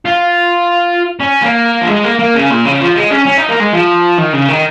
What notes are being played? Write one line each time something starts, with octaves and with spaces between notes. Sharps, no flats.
F4
C#4
A#3
F3
G#3
A#3
A#3
C#3
A#2
C#3
F3
G#3
C#4
C#4
D#4
A#3
G#3
F3
D#3
C#3
D#3